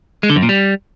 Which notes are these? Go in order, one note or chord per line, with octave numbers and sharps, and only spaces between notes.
G#3
D3
F#2
A#2
G3